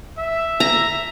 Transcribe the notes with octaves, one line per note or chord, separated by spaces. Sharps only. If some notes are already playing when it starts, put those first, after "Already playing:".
E5
A#5